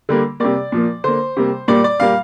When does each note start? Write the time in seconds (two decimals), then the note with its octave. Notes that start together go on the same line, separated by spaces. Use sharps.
0.09 D3 G3 A#3
0.40 C3 G3 A#3 D5
0.72 A#2 F3 A#3
1.04 D3 A#3 C5
1.37 C3 G3 A#3
1.68 A#2 G3 A#3 D5
1.84 D5
2.00 A#2 G3 A#3 F5